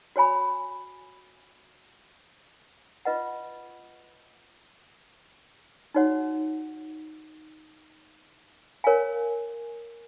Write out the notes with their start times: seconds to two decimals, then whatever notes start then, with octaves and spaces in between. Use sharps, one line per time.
0.16 F#4 C#5 G#5 B5
3.05 F4 B4 D#5 F#5
5.94 D#4 F#4 C#5 F#5
8.84 A#4 C#5 F5 G#5